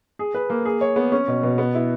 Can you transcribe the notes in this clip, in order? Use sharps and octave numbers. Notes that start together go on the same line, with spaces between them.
G#4
B4
A#3
G#4
C#5
B3
C#4
B2
B2
B3
E4